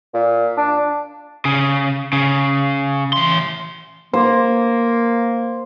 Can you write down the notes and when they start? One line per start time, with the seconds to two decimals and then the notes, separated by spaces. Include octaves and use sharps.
0.14 A#2
0.57 D4
1.45 C#3
2.13 C#3
3.13 E3 C6
4.13 A#3 C5